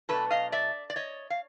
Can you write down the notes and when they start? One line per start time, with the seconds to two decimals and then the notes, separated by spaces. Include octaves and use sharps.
0.09 B2 F#3 A3 D4 A4 B4
0.31 D#5 F5
0.52 D5 E5
0.90 D5
0.96 C#5 D#5
1.30 F5